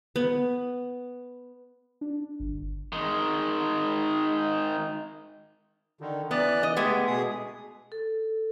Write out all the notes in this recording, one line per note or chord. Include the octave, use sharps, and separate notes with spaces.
B3
D4
G1
D#3 G#3
D3 D#3
E3 B3 D5 F#6
D#5
G#3 A3 B3 G4
B2 G#4 D#6
A4